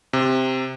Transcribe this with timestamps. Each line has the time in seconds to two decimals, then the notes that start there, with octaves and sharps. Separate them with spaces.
0.13 C3